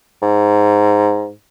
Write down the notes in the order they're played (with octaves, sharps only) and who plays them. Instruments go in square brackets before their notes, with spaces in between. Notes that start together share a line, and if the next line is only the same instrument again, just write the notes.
[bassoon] G#2